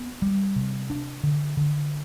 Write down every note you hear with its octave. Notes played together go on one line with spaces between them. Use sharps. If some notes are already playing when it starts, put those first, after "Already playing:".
Already playing: B3
G3
C3
D4
D3
D3